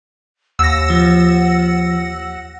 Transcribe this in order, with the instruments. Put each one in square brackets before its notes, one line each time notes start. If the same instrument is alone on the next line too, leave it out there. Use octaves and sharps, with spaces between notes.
[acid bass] D#2 [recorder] F#5 [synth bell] E6 A#6
[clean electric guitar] F3